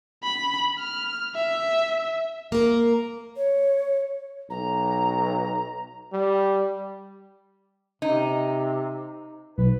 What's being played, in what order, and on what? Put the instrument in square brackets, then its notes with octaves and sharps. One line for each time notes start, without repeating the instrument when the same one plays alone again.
[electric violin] B5
F6
E5
[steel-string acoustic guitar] A#3 A#4
[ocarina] C#5
[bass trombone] B1 [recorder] A#5
[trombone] G3
[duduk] C3 [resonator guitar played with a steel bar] D#4
[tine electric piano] B1 [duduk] B4